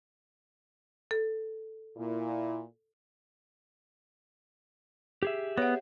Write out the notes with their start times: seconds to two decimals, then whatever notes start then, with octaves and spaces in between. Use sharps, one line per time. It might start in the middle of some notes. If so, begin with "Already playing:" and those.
1.11 A4
1.97 A#2 E4
5.23 G4 G#4 E5
5.58 B3 C#5 F#5